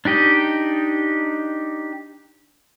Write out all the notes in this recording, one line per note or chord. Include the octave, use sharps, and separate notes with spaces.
D4 D#4 G4 D#5